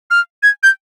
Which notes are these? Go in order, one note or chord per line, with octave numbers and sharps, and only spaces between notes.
F6
G#6
G6